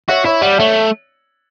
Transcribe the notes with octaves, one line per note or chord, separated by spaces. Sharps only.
F#4 C#5 E5
E4 C#5 E5
G3 D5 F#5
A3 C#5 E5